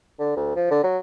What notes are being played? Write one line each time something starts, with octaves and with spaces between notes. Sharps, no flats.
D3
D2
F3
D3
F#3